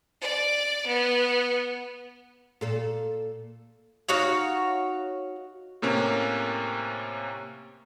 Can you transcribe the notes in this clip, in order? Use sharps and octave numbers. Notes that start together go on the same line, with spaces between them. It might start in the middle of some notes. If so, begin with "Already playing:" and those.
D5 D6
B3
A#2 A4 F5
D#4 F#4 C#5 F5
A2 C3 A#3 C#4